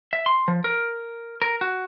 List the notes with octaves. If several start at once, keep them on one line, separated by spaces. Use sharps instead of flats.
E5
C6
F3
A#4
A#4
F#4